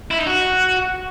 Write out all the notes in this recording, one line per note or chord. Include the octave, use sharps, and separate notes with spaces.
E4
D#4
F#4